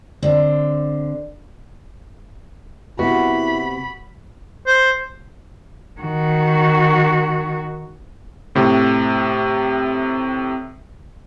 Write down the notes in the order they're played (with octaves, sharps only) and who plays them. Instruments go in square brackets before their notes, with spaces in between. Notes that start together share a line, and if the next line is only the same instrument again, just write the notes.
[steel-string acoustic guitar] D3 C4
[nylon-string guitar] C3 B3 [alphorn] E4 [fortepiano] F#4 [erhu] B5
[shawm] C5
[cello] D#3 F#4
[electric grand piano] A2 C3